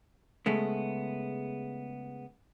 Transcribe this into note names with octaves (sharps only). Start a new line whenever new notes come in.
C#3 G#3 A3 B3